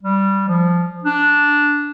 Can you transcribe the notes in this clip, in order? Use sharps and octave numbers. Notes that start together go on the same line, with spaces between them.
G3
F3
D4